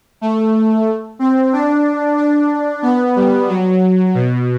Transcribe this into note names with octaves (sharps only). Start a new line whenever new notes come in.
A3
C4
D4
D4
B3
G3
F#3
B2